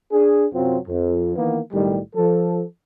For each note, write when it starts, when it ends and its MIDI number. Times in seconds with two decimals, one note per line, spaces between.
0.12 0.46 62
0.12 0.46 68
0.54 0.77 42
0.54 0.77 48
0.54 0.77 54
0.54 0.77 60
0.54 0.77 65
0.88 1.35 41
1.36 1.59 51
1.36 1.59 52
1.36 1.59 58
1.36 1.59 59
1.73 1.99 35
1.73 1.99 45
1.73 1.99 51
1.73 1.99 55
2.16 2.63 53
2.16 2.63 69